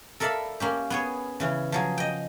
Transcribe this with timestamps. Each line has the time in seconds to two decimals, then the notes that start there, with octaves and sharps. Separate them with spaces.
0.20 A4 A#4 D5 E5 F5 B5
0.60 A#3 C#4 G4
0.90 B3 G#4 C#5
1.40 C#3 E3 C#4
1.72 F3 F#3 G#4
1.98 D#5 G5